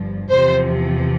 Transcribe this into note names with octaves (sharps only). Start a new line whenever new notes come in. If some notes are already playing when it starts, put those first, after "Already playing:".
Already playing: G1 G2 F3
E2 C3 F3 C5